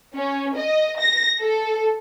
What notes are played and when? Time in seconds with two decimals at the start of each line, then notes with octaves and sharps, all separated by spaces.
0.14 C#4
0.56 D#5
0.98 A#6
1.41 A4